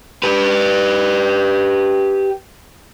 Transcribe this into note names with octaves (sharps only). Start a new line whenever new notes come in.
G4 B4